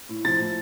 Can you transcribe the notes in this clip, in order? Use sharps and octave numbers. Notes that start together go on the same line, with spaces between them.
A2
F3 A6
A2